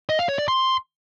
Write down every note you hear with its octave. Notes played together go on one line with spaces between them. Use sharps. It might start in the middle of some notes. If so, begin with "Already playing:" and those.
D#5
F5
C#5
D5
C6